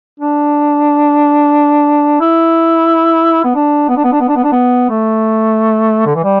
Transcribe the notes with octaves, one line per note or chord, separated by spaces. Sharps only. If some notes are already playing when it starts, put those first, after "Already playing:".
D4
E4
B3
D4
B3
D4
B3
D4
B3
D4
B3
D4
B3
A3
D3
E3
G3